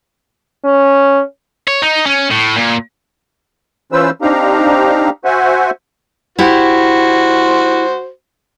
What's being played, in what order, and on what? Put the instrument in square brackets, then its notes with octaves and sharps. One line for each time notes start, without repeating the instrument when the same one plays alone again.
[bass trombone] C#4
[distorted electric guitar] C#5
D#4
C#4
A2
A#2
[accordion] E3 C#4 F4 B4 C5 E6
C4 D4 D#4 G4 F5 A#5
F#4 C5 E5 F#5 G#5
[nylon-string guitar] E4 G4 F#5 [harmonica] F#4 C5